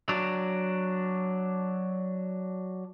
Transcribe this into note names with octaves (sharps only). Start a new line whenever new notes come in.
F#3 D4